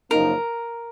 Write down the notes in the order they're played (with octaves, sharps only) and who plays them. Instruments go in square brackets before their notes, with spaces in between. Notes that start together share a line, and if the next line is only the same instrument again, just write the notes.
[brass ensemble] F#1 F#2 F3 A#3 D#4 [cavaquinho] A#4